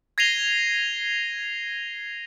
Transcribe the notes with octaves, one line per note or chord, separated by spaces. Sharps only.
G#6 A#6 C7 D#7 F7 G7